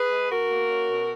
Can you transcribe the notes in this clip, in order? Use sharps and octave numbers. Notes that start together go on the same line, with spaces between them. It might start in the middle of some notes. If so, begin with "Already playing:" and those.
Already playing: G#4 B4
G#3
B2 F#4 A#4
A#3
C#4
B2